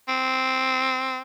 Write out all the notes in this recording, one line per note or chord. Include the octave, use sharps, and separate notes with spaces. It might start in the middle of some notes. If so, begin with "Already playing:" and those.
C4